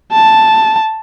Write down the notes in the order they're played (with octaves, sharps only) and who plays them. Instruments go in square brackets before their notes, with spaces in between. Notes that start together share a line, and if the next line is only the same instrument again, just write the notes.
[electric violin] A5